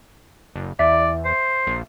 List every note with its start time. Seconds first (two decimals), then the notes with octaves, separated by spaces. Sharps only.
0.56 F#1
0.79 E2 D5 E5
1.25 C5
1.67 A#1